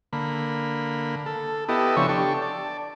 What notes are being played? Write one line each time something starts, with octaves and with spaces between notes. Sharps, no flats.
D3 A#3 B5
A4
B3 E4 G4 A4 D#5
C#3 F3 D4 C#5 E5 C#6
D4 G4 A4 C#6
D5 A5